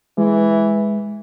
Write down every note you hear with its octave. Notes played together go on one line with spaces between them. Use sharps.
E3 G#3